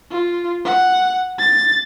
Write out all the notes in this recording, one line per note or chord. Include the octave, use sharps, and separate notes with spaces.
F4
F#5
A6